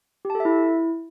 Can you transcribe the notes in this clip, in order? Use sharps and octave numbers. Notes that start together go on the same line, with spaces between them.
G4
A5
A4
E5
E4